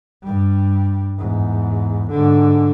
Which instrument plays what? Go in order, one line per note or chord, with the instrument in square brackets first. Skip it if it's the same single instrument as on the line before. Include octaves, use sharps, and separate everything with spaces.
[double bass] G2 G3
E2 G#2
G#2 D3